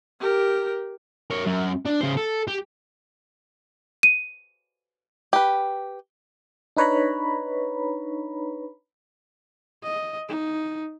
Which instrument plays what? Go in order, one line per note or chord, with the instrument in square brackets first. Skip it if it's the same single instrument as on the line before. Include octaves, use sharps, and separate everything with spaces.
[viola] G4 A#4
[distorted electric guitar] A#4 C#5
F#2
D4
C#3 C5
A4
G4
[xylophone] D#7
[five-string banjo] G4 B4
[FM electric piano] D4 D#4 B4 C#5 A#5 B5
[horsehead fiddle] D#5
D#4